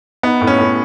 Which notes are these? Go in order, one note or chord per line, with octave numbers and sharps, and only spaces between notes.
B3 D#4
A2
C#4
A2